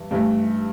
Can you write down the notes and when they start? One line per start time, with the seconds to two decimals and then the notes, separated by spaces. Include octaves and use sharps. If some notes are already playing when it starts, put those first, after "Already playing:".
Already playing: G2 E3
0.11 G2 E3 A3